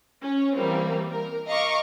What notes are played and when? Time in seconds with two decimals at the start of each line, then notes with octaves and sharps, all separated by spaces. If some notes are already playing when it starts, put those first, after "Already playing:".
0.22 C#4 C#5
0.55 E3 G3 A#3 C4
1.10 A#4
1.47 D#5 F5 A#5 C#6 D6